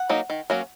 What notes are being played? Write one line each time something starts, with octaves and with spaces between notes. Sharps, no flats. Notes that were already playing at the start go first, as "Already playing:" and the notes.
Already playing: F#5
F#3 A#3 D#4
D#3
F#3 A#3 C#4